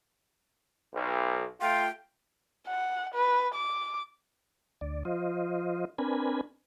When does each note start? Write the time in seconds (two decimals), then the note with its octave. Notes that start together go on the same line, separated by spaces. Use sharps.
0.94 B1
1.61 A3 F4 G5
2.68 F#5
3.15 B4
3.54 D6
4.81 D2 D5
5.05 F3 F4 C5 D#5
5.98 C4 D4 A#4 B4 G#5 B5